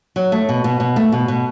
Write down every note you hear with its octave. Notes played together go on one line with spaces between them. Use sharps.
F#3
A3
B2
B2
B2
A3
B2
B2